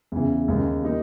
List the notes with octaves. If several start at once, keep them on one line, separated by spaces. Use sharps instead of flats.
E2 C#3 E3
D#2 C#3 G#3
G3 A#3 D#4